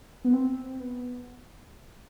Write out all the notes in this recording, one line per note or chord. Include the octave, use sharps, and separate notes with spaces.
B3
C4
B3